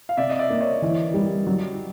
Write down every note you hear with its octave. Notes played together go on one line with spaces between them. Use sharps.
F5
C3 D5 E5
D#5
D5 E5
A#3
C#5 D#5
E3
G3
F#3